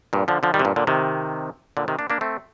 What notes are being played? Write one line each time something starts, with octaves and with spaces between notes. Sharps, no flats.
G2 A#2
D3 F3
D3 F3
D#3 G3
C3
G2 A#2
A#2 D3
C3 D#3
A#2 D3
C3 D#3
A#3 D4
A#3 D4
A3 C4